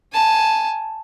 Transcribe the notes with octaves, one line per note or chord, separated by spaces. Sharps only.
G#5 A5